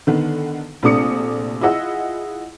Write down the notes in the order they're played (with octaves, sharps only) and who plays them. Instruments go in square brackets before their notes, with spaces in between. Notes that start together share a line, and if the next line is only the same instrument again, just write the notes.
[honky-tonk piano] D3 D#3 B3
A#1 C3 A3 D4 D#6 C#7
E4 F4 G#4 D#5 F#5 E6